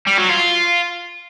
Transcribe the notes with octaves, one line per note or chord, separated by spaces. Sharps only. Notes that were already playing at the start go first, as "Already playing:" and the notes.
G3
F#3
F4